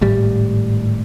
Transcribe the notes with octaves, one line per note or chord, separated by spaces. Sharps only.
G#1 A2 G3